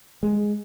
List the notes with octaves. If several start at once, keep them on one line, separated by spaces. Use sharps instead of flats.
G#3